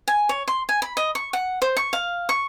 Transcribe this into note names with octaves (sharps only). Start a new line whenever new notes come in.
G#5
C#5
C6
G#5
B5
D#5
C#6
F#5
C5
C#6
F5
C#6